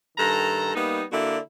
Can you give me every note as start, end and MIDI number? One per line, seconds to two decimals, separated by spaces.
0.18 0.73 43
0.18 0.73 51
0.18 0.73 69
0.18 0.73 82
0.75 1.03 55
0.75 1.03 58
0.75 1.03 59
0.75 1.03 63
1.12 1.38 50
1.12 1.38 58
1.12 1.38 64
1.12 1.38 66
1.12 1.38 74